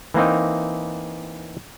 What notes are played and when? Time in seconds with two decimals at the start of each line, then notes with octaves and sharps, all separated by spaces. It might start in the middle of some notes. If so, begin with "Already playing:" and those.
0.14 E3 A#3 C4 D#4